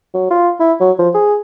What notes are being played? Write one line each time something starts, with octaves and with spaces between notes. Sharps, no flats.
F#3
F4
E4
F#3
F3
G#4